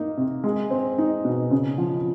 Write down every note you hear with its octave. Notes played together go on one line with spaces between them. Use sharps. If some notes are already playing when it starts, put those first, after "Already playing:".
Already playing: A#3 D#4
C3
G#3
C4
D#4
B2
C#3
F3